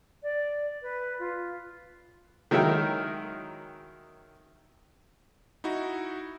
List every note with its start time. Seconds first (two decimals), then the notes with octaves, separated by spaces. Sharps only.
0.23 D5
0.82 B4
1.19 F4
2.51 D#3 F#3 G#3 E4 A#4 G5
5.64 D#4 E4 F#4